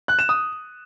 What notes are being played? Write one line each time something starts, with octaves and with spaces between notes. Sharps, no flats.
F#6
E7
D#6